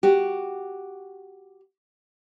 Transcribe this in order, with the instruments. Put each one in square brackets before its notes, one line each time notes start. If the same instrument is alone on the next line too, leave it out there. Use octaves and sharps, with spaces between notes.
[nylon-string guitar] F#4 G4